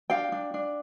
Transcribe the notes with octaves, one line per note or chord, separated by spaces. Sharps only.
D4 F5 G5
D4
D4